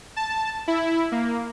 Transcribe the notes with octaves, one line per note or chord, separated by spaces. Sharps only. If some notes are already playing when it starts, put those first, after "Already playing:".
A5
E4
A#3